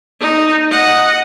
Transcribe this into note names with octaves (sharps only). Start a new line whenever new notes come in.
D#4
D#5 F#5